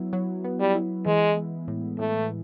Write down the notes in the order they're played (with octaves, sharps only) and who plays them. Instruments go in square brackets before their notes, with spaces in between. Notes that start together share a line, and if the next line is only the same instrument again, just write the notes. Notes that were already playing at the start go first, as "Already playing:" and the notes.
Already playing: [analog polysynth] F#3 B3 E4
F#3
B3
[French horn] G3
[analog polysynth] E4
[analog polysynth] E3 [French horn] G#3
[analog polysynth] G#3
A2
[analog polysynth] A2 [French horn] A3